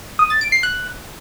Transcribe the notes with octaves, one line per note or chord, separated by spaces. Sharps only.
D#6
A6
D7
C7
F#6